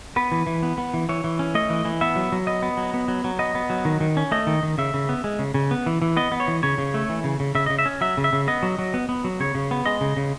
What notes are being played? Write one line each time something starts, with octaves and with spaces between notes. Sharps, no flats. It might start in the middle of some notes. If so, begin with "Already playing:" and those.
B3 B4
E3
E3
B3
B3
E3
E3 C#5
E3
C#4
A3 D#5
E3
E3
B3 E5
F#3
F#3
B3 D#5
B3
F#3
B3
F#3
F#3
B3 D#5
B3
F#3
D#3
D#3
C#4
A3 D#5
D#3
D#3
C#3 E5
C#3
B3
G#3
C#3
C#3
B3
E3
E3
B3 D#5
B3
C#5
E3
C#3 C#5
C#3
A3
E3
C#3
C#3
C#3 E5
D#5
C#3
E5
C#4
F#3 E5
C#3
E5
C#3
B3 D#5
F#3
F#3
B3
B3
F#3
C#3 C#5
C#3
B3
G#3 D#5
C#3
C#3